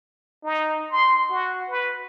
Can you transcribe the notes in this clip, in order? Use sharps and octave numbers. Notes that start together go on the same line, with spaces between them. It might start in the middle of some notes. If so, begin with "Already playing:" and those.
D#4
C6
F#4
B4